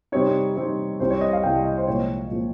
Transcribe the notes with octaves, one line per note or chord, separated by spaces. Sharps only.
C3 G3 C4 D#4 C#5
C3 G3 C4 D#4
C2 C3 G3 C5
C#5
D#5
F5
C2 C3 G3 G5
D#5
C5
C2 A#2 F3 G#3 C4 C#5
A#2 F3 G#3 C4